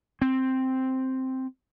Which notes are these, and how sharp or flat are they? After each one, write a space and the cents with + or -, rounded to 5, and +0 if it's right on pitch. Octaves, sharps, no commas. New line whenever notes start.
C4 +0